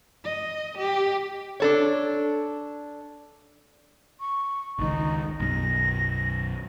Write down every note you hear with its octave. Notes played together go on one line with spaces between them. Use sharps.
D#5
G4
D4 A4 C#5
C#6
G#1 C#2 D#3 D#4
B1 F#2 A#6